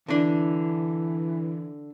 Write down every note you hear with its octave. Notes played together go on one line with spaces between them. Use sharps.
D3 E3 D4